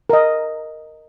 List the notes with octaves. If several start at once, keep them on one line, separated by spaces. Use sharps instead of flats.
A#4 D#5